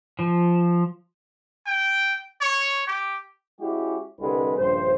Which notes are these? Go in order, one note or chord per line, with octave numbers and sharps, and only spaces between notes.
F3
G5
C#5
G4
G#3 C#4 E4 F#4 G4
C2 D3 G3 G#3 B4
A#1 G2 C#3 C5